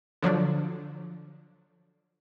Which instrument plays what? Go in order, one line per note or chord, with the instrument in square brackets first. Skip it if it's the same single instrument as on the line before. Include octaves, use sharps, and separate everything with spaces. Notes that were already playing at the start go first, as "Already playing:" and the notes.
[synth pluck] D3 F3 F#3 D4